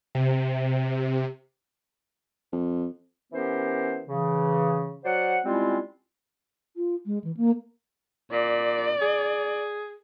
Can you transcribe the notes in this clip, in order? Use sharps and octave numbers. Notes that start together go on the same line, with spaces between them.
C3
F2
E3 B3 C#4 G4 A#4 C5
C#3 E3
F#3 C5 D5 F#5
G3 G#3 C4 C#4 E4 F4
F4
G#3
E3
A#3
A#2 D5
G#4